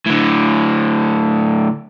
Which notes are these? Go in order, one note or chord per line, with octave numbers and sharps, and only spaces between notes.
A2 D3